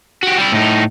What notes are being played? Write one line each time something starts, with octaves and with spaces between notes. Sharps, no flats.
F#4 G4
G3 E4
A2 D#4